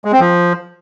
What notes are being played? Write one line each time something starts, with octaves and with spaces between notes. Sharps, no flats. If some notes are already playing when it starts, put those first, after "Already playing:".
G#3
C4
F3